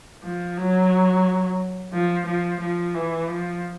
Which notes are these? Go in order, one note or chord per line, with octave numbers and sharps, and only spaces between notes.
F3
F#3
F3
F3
F3
E3
F3